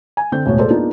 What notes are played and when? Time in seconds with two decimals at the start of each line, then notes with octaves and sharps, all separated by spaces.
0.17 G#5
0.32 D3 C4 G6
0.46 E1 D2 A2 F#4 C#5
0.59 G#4 A4 C5 D5
0.70 A#3 B3 D4 D#4 F4 G#4